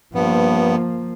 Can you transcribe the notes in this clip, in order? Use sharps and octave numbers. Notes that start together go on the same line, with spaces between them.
G2 F3 A#3 B3